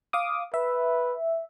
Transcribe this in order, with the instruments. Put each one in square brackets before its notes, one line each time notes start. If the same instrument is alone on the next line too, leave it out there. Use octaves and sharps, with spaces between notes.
[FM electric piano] F5 D6 D#6
[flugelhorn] B4 [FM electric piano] E5